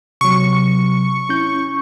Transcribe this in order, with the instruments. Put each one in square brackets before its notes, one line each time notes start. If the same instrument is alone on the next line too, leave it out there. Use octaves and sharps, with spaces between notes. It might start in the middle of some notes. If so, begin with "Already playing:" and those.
[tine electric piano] C3 F#3 [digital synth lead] C#6
[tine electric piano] C#4 E4 G6